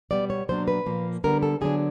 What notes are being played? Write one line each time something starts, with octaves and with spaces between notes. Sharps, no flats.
B2 G3 B3 D5
C#5
B2 F#3 A#3 D4 C5
B4
A#2 F3 A#3
D3 G3 B3 D4 A#4
A4
D3 F#3 B3 D4 G#4